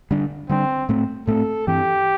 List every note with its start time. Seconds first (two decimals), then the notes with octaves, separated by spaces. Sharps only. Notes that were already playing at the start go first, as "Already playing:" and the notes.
0.11 D3 G3 D4
0.49 D3 G3 C4 D4
0.89 A2 A3 C4
1.27 A2 A3 C4 A4
1.67 G2 E3 C4 G4